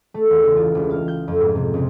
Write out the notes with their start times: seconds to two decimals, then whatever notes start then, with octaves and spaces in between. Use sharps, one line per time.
0.14 A3
0.30 E2
0.44 C#2
0.57 F4
0.75 E1
0.90 F5
1.08 G6
1.28 F2
1.41 G#2
1.55 C3
1.74 C#2